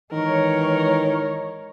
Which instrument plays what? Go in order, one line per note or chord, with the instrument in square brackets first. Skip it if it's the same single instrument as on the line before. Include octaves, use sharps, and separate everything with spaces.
[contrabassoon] D#3 [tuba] E3 [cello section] G#3 C#5 [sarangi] A#4